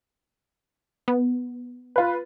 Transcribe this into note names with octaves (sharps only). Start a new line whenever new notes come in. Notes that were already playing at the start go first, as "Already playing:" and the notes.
B3
F4 B4